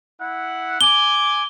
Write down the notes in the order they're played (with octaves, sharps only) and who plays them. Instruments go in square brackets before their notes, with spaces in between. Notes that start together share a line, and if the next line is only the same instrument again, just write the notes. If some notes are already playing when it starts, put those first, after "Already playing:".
[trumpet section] E4 F#5
[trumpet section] G#5 D6 [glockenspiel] G7